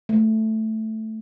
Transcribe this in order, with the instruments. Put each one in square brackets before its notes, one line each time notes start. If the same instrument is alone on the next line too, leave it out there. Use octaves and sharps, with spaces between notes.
[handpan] A3